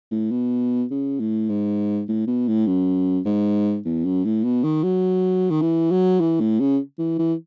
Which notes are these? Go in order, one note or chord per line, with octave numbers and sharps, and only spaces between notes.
A2
B2
C#3
A2
G#2
A2
B2
A2
F#2
G#2
E2
F#2
A2
B2
D#3
F#3
D#3
E3
F#3
E3
A2
C#3
E3
E3